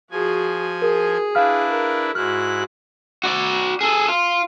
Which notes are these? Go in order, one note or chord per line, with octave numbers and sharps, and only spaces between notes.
F3 F#4 G#4 G#5
G#4 A#4
D4 E4 B4 F5 F6
A#4
G#2 E4 F#4 F6 F#6
F#4 D5
G#4 A4
F4